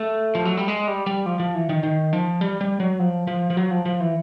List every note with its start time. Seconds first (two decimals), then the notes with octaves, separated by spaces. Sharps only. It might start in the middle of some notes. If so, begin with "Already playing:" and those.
Already playing: A3
0.35 F3
0.45 F#3
0.57 G3
0.68 G#3
0.88 G3
1.07 G3
1.26 F3
1.40 F3
1.55 E3
1.69 D#3
1.83 D#3
2.13 F3
2.41 G3
2.61 G3
2.80 F#3
2.99 F3
3.27 F3
3.50 F3
3.57 F#3
3.71 F3
3.86 F3
4.00 E3